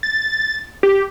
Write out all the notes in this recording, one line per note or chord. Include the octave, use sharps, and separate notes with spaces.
A6
G4